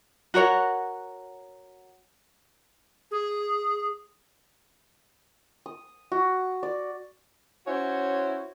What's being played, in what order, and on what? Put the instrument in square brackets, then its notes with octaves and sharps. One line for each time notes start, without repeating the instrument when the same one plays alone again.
[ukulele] F#4 A#4 C#5 F#5
[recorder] G#4
[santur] D#6
F#4
D5
[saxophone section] C#4 E4 F#4 C5 C#5